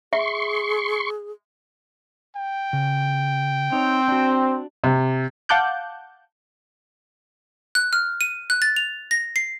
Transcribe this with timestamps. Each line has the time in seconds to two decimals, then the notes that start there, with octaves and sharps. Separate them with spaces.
0.13 G#4 E5 C6 C#6
2.36 G5
2.73 C#3
3.72 C4 D#4 C#5
4.08 D4 F#4
4.84 C3
5.49 F5 F#5 A5 D6 F#6 G6
7.75 F#6
7.93 F6
8.21 D#7
8.50 F#6
8.62 A6
8.76 F7
9.11 A#6
9.36 C7